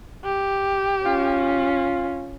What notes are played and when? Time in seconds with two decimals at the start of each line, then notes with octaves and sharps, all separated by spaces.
0.24 G4
1.05 C#4 F4